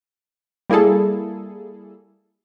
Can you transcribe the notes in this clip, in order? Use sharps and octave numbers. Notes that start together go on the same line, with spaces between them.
G3 A#3 E4 G#4 A4